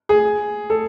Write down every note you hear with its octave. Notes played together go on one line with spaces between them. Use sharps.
G#4
A4